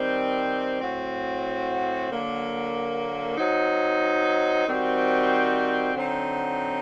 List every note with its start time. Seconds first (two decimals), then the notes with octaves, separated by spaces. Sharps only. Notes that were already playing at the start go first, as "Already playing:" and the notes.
Already playing: D#3 G3 C4
0.81 A2 F#3 C4 F#4
2.09 D3 F#3 A#3
3.38 F#3 C4 D#4
4.66 D#3 G3 C4 F#4
5.94 D3 F#3 C4 D#4